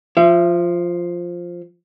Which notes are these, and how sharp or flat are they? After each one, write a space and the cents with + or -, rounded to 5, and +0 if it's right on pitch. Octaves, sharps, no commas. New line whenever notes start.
F3 +0 E5 +40